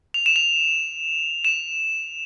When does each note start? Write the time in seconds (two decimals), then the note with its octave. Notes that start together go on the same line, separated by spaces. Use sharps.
0.14 F7
0.26 E7
0.36 F7
1.45 E7